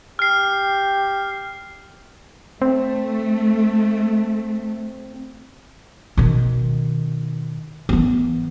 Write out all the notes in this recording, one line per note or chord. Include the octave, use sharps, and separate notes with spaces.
G4 F6 C7
A3 C4
B2 D#3
E3 B3